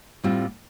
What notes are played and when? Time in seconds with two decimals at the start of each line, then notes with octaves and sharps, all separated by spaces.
0.24 A2 G3 C4 F4